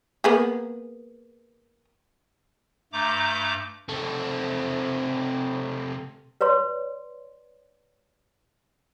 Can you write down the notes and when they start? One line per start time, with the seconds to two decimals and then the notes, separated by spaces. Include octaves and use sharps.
0.24 A#3 B3 G#4
2.93 G2 A3 A#5 D6 G6
3.89 C3 A3 C4 A4
6.41 B4 C#5 D5 C6